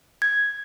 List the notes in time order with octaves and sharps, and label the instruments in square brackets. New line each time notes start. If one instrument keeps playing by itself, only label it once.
[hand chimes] G#6